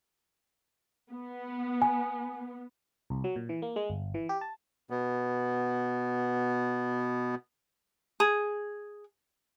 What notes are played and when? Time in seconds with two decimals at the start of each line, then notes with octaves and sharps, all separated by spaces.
1.11 B3
1.82 G#5
3.10 C2
3.24 F#3
3.36 A#2
3.49 E3
3.62 A#3
3.76 G#3
3.90 G1
4.14 E3
4.29 G4
4.41 A5
4.90 B2 B3
8.20 G#4